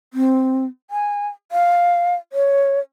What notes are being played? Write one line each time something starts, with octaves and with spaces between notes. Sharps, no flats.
C4
G#5
F5
C#5